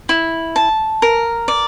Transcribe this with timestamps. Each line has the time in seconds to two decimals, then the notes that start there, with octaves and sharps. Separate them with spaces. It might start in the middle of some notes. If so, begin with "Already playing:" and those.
0.09 E4
0.56 A5
1.02 A#4
1.48 D5